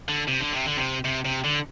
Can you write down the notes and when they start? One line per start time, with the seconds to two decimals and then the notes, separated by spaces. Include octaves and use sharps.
0.08 D3
0.27 C3
0.41 D3
0.53 C3
0.66 D3
0.77 C3
1.05 C3
1.26 C3
1.45 D3